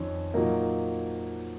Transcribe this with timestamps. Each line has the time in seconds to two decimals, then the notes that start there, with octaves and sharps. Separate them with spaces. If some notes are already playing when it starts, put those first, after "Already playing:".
Already playing: F2 D#3 C#4
0.34 A#2 F#3 A#3 D#4